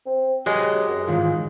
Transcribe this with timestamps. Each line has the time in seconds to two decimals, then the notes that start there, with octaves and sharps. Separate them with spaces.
0.06 C4
0.46 F#3 G#3 G4 B4 D#5
0.88 F#2
1.07 G#2 D#3 E3 F4